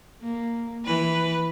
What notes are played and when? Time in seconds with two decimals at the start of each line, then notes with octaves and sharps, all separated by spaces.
0.22 A#3
0.85 E3 B4